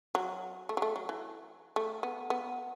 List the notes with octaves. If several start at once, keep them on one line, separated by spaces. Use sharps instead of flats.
F#3
A3
F#3
A3
F#3
E3
A3
B3
B3